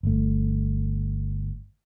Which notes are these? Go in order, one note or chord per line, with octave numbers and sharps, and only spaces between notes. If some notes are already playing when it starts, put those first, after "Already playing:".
G1 A3